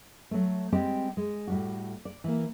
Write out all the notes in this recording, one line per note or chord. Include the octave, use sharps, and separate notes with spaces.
F#3 A3
G3 G#3 C4 G4 D#5 G5
G#3
A2 G3 F#4
D5
E3 A#3